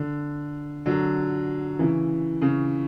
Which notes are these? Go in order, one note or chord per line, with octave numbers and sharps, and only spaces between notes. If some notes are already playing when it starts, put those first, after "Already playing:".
Already playing: D3
D3 F#3
C#3 E3
C#3